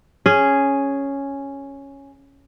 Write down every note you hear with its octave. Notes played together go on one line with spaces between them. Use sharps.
C#4 G#4